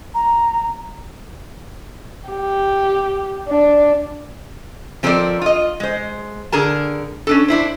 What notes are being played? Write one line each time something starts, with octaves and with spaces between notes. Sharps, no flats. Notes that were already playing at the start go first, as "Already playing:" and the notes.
A#5
G4
D4
F3 C4 A4 A#4 C#5 D5
F4 D#5
G#3 C5
D3 G#4 A#4 A5
C#4 D4 A4
D4 E4 C5